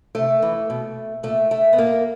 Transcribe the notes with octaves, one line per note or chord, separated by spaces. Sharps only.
C3 A3
E3
B2
A#2 A3
A3
B3
A#2 A#3